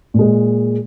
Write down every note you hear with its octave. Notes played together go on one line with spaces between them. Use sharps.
A#2 G#3